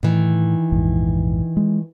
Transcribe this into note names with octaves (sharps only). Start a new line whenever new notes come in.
A2 D#3 E3
A#1 F2 G#2
G#3